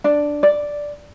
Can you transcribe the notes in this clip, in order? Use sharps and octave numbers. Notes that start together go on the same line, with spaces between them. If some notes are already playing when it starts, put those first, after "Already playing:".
D4
D5